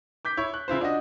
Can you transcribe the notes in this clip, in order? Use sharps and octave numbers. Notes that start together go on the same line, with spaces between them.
D6 G6 B6
E4 C#5
F#6
C#3 E4 F4 C5
D4 F#4 D#5